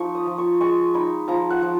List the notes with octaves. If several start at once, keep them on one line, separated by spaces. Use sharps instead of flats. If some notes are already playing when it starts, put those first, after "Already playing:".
Already playing: F3 D#4 C#6
D#6
F3
C#6
G#3 C#6
D#4 B5
F3 A#5
F#5
F3